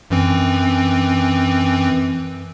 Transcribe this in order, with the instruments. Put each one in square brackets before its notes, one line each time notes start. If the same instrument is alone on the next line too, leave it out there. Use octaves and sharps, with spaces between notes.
[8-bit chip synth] F#2 E3 C4